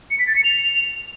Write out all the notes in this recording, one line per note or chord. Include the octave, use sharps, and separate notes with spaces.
C#7
B6
A6
C#7
F7